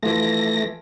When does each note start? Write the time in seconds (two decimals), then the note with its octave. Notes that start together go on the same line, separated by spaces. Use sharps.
0.03 E3 F3 A3 A#6